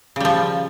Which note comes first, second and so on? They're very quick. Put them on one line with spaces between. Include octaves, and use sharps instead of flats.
C#3 G3 F3